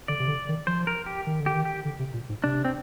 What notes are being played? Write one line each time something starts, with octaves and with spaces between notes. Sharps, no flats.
D3 D5
C3
D3
D#3
F3 C5
A#4
G4
D#3
D3
G4
D#3
G4
D3
C3
A#2
G#2
C3 D4
C4